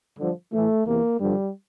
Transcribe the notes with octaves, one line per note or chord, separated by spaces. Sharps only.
G2 D3 F3
A2 E3 A3
E2 C3 E3 A#3
G2 D3 F3 G3